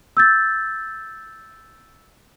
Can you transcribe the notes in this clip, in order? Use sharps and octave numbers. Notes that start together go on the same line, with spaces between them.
E6 G6 A6